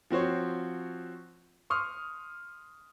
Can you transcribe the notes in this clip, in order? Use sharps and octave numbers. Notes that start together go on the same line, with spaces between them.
F3 C4 F#4 C5 C#5
C6 C#6 D#6 F6